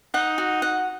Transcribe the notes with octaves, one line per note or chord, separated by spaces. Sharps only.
D#4 F#5
F#4
F#5